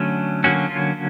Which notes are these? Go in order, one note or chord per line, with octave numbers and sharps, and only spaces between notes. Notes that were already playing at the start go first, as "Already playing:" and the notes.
Already playing: D3 F#3 A3 C#4
D3 F#3 A#3 C#4 F#4
F4